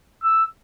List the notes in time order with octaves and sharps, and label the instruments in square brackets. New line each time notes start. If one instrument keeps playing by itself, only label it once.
[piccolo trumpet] E6